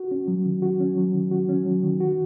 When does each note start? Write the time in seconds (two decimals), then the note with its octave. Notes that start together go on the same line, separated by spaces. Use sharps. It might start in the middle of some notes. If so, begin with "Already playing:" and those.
Already playing: F#4
0.11 C#4
0.28 F#3
0.46 D#3
0.62 F#4
0.80 C#4
0.97 F#3
1.14 D#3
1.31 F#4
1.49 C#4
1.66 F#3
1.83 D#3
2.00 F#4